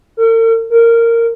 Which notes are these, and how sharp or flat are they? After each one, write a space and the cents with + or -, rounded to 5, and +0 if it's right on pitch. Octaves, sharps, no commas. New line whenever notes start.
A#4 -45
A#4 -15